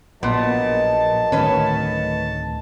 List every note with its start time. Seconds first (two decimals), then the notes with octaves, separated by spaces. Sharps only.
0.23 A#1 A#2 F#3 B3 A#4 D#5 A5
1.32 D1 D#3 A3 C#4 B4